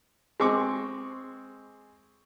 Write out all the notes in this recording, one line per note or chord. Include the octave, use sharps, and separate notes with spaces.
G#3 C4 C#6 D6